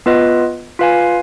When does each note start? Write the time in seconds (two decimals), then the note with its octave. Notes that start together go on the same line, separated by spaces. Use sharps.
0.06 B3 F4 B4 D#5
0.79 F4 B4 F5 G#5